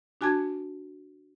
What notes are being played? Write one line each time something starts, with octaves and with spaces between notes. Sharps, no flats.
D4 F#4 G#5 A5 G#6